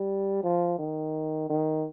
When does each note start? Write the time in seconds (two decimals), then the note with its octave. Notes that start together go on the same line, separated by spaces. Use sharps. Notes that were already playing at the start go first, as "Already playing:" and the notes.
Already playing: G3
0.43 F3
0.79 D#3
1.49 D#3